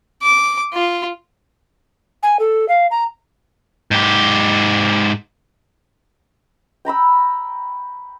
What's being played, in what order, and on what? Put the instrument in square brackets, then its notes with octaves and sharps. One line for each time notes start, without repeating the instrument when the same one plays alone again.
[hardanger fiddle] D6
F4
[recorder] G#5
A4
F5
A#5
[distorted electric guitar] G#2 G4
[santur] G5 A#5 B5 E6